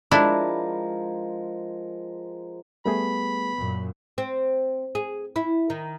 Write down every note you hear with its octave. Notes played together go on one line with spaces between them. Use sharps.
F3 G#3 D4 E4 A#4
G3 A3 B3 G#4 B5
F#2 A#2
C4
G#4
E4
D#3